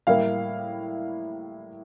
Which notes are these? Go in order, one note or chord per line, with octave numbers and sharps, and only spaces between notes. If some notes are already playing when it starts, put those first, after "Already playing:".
A2 G3 A#3 E4 F5